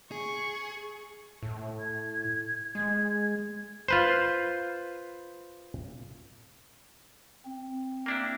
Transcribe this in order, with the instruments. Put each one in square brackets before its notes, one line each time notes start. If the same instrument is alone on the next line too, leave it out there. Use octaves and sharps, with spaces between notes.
[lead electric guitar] G#4 [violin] C#6
[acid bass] A2
[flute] G#6
[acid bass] G#3 [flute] G#6
[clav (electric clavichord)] F4 B4 C5
[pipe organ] C4
[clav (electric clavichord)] A#3 D4 E4